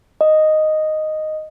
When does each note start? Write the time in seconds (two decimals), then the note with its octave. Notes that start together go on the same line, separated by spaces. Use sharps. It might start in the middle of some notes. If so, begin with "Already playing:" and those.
0.21 D#5